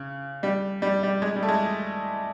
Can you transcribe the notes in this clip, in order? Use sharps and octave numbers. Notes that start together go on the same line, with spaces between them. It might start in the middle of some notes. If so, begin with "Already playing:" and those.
Already playing: C#3
G3
G3
G3
G#3
G3
A3
G#3